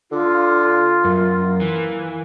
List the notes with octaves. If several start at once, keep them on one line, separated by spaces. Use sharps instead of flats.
D3 F4
F#2 A#3
E3